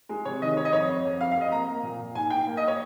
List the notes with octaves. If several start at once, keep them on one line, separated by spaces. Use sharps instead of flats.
G#3
C3 C#5
D#3 D#5
G#3 C#5
D#5
F2 C#5
F2
F2
F2 F5
F5
F2 D#5
A#3 A#5
A#3
A#2
A#2
G#2 G#5
G#2 G5
A#3
D#5
C#5